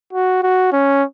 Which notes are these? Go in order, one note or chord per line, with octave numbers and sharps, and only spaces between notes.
F#4
F#4
C#4